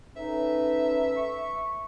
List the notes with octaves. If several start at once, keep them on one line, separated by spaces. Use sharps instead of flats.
C#4 D#4 A4 B4 E5
C#6